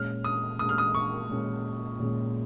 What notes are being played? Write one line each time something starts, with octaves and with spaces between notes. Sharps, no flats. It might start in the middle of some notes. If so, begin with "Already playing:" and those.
Already playing: A#2 G#3 C#4 F6
D#6
A#2 G#3 C#4 D#6
F6
D#6
C#6
A#2 G#3 C#4
A#2 G#3 C#4